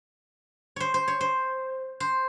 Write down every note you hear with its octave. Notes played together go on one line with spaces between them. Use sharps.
C5 C#5
C5
C#5
C5
C5